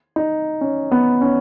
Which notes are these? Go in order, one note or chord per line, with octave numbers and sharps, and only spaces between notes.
D#4
C#4
B3
C#4